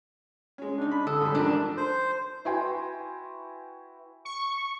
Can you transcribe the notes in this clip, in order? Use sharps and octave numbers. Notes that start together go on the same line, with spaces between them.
G#3 C#4
C#3 D4 D#4
B5
D3 A4 D#6
G#2 G3
A1 G#2 F3 D4 A#4
C5
E4 F#4 B4 G5 G#5 C6
C#6